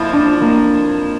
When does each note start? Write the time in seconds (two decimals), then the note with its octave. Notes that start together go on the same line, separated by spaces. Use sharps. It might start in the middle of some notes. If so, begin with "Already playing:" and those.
Already playing: F2 F3 A#3 E4
0.13 D4
0.41 A#3